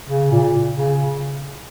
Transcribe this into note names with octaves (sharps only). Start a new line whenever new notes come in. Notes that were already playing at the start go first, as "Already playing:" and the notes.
C#3
A#2
C#3